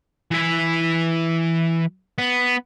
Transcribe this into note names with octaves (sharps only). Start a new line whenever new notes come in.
E3 E5
B3